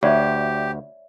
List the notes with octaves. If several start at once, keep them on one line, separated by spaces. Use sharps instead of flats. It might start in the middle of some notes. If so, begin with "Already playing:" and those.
D2 G4 C#5 D5 E5